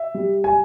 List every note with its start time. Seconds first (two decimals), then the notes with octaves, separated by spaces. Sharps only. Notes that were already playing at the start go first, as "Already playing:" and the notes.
Already playing: E5
0.14 G3
0.44 G#5